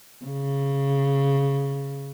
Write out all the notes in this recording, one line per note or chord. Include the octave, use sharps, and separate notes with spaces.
C#3